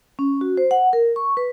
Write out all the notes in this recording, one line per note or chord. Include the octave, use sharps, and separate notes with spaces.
C#4
F#4
C5
F#5
A#4
C#6
B4